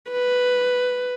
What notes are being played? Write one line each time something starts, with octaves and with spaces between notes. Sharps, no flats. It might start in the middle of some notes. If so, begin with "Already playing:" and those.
B4